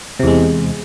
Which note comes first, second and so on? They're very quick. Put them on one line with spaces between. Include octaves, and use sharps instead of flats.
C3 E2 G#3